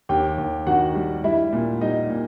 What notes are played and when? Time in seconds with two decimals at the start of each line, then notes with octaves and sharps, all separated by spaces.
0.09 D#2 G4 G5
0.38 D#2
0.67 D#3 F#4 F#5
0.95 G3
1.24 G3 E4 E5
1.53 A#2
1.81 G3 D#4 D#5
2.10 A#2